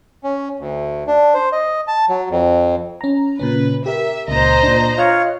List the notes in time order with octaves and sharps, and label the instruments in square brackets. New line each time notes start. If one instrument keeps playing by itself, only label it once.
[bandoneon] C#4
D2
D4
C5
D#5
A5
F#3
F2
[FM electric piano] C#4 A#5
[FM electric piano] A#2 C#3 C#4 [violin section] B4
[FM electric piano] G4 A#4 [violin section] E5
[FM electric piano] C#2 A#2 [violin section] C5 D#5 A#5
[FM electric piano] A#2 D4
[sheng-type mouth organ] F4 C#5 [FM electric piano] D#5 F6 F#6